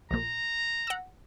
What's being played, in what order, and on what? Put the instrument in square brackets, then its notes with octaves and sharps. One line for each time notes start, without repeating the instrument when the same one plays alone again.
[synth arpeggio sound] A#1 A#2 [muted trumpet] A#5
[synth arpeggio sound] F#5 E6